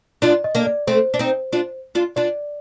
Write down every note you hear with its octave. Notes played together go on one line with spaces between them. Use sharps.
D4 F4 D5
D#5
A#3 D4
D5
A3 C4 C5
D4
C4 D#4
D4 F4
D4 F4
D4 F4 D5